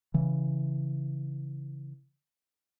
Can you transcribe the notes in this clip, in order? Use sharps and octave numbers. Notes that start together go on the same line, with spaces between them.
C#3 E3